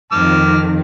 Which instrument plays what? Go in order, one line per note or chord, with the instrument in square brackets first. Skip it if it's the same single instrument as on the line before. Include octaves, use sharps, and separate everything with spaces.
[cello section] F2 D#3 [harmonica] A5 D6 F6